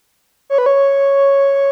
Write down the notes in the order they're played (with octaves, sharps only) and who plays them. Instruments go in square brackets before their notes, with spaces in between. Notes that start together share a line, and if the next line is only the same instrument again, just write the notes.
[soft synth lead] C#5
B4
C#5